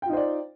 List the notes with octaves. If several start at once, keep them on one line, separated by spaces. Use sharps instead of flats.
D#4 F4 C5 D5 G5